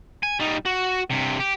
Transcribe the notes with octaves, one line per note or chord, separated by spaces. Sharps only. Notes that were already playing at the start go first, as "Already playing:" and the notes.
G#5
G3 D#4
F#4
G2 C3
G4